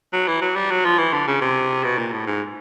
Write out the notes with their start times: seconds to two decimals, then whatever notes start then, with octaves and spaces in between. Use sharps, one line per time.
0.13 F#3
0.28 E3
0.41 F#3
0.56 G3
0.71 F#3
0.85 F3
0.98 E3
1.13 D3
1.27 C#3
1.41 C3
1.84 B2
1.98 A#2
2.13 A2
2.27 G#2